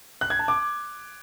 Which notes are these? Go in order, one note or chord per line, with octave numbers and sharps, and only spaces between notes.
F#6
G#6
A5
D6